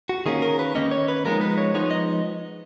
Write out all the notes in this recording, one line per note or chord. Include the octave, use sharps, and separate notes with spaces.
F#4
D#3 A#3 C#4 G#4
A#4
B4
D#3 A#3 C#4 D#5
C#5
B4
F3 G#3 B3 D#4 A#4
B4
C#5
F3 G#3 B3 D#4 C#5
D#5